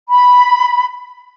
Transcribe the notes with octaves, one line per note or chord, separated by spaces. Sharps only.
B5